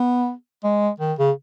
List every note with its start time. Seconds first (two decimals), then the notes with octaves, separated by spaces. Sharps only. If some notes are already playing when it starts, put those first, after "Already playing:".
Already playing: B3
0.64 G#3
1.00 D#3
1.19 C#3